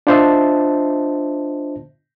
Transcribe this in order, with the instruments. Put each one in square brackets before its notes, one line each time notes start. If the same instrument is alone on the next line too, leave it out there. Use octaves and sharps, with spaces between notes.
[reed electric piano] D4 F4 C5 D#5 E5 A5